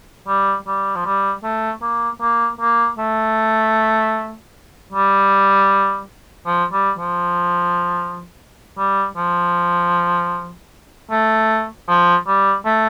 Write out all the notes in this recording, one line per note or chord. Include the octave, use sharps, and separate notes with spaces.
G3
G3
F3
G3
A3
A#3
A#3
A#3
A3
G3
F3
G3
F3
G3
F3
A3
F3
G3
A3